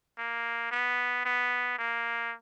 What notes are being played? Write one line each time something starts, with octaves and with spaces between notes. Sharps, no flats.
A#3
B3
B3
A#3